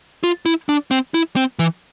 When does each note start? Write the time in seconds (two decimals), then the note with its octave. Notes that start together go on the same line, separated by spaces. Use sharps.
0.24 F4
0.46 E4
0.69 D4
0.91 C4
1.14 E4
1.36 C4
1.59 E3